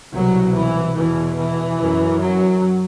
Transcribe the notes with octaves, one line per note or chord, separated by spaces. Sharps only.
C2 B2 F#3
E3
E2 B2 E3
E3
F#2
F#3